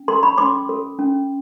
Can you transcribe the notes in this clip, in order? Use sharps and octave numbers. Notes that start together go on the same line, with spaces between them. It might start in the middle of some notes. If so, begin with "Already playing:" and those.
Already playing: C#4
A4 C6 D6
B5 C#6
C#4 C6 D6
A4
C#4